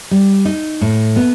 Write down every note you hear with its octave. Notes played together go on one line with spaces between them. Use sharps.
G3
D#4
A2
B3